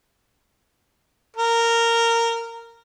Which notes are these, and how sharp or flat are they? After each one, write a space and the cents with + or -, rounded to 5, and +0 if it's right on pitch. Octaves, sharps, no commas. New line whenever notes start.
A#4 -15